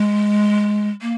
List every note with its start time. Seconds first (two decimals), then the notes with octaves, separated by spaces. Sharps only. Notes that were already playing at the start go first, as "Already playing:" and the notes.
Already playing: G#3
1.01 A#3